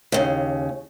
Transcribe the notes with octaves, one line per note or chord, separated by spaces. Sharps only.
D#2 C#3